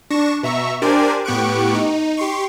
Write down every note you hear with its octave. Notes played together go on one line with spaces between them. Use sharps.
D4 C#6 A#6 E7
B2 E5 A#5 C#6
D4 G4 A#4 C5 D5 G#5
A2 B3 G4 C#6 F#6 D7
D#4
G4 C6 C#6